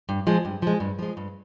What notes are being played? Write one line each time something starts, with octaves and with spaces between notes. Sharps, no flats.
G2
F3 G#3
G2
F3 G#3
G2
F3 G#3
G2